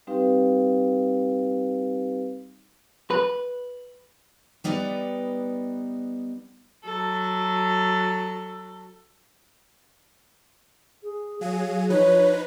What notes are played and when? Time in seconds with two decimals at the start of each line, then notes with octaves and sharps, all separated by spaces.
0.07 G3 C4 D#4 G4 B4 F5
3.10 B4
4.64 G3 B3 D#4 B4 D5
6.84 F#3 A4
11.03 G#4
11.41 F#3 G#4 F5 D#7
11.90 F3 D#4 B4 C#5